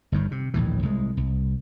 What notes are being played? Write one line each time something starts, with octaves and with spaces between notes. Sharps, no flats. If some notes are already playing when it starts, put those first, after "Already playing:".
G1 G2 D#3
C3
A#1 D#2 A2 E3
C2 G#3
C2